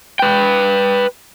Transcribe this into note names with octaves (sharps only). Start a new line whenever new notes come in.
B4 G5